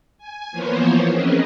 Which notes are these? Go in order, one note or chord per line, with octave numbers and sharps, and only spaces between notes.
G#5
E3 F3 A#3 B3 C5 C#5
C4 C#4 G#4 A#4 B4 D#5